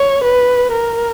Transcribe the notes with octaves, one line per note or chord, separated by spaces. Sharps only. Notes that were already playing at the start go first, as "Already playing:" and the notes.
Already playing: C#5
B4
A#4